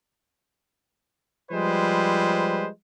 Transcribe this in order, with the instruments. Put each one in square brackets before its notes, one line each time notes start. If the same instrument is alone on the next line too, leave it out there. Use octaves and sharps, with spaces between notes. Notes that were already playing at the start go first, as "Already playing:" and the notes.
[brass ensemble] F3 G3 G#3 B4 C5